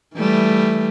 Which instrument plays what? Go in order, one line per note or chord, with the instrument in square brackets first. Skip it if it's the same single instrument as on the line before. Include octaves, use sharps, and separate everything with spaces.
[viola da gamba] E3 G3 A3